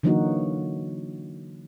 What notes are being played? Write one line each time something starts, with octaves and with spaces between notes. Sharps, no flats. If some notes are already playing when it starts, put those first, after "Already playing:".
D3 E3 F#3 A#3 D#4 F#4